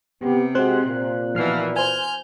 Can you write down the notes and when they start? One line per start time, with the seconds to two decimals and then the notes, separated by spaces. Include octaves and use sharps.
0.22 C3 B3 G4
0.55 G#3 C4 F#4 G4 C5 F#6
0.87 A#2
1.35 B2 E3 F3 F6 C7
1.76 C5 G#5 F6 G6